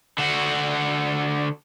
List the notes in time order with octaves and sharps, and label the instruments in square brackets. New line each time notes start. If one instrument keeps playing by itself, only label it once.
[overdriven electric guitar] D3 F#4